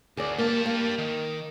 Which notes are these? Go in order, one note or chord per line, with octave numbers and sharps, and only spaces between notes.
D2 G#4 D5
G3 A#3 A5
A#3
D#3